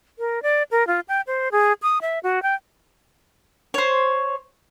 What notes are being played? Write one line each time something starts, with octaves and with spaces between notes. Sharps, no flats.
A#4
D5
A#4
F4
G5
C5
G#4
D#6
E5
F#4
G5
C5 C#5